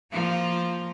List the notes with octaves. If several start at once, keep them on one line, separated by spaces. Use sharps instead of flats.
F3 A#3 F4